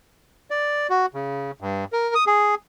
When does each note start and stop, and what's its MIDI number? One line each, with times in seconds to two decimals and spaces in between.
0.51 0.87 74
0.90 1.06 66
1.14 1.51 49
1.60 1.84 43
1.93 2.14 70
2.15 2.24 87
2.27 2.55 68